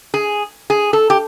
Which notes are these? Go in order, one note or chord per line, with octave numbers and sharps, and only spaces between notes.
G#4
G#4
A4
G4